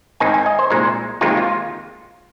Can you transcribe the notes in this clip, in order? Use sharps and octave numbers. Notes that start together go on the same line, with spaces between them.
G#2 D#3 C4 D#4 G#5
G#5
D#5
C5
C2 A#2 G#3 D#4 C5
D#2 D#3 G#3 C4 D#4 F4
F4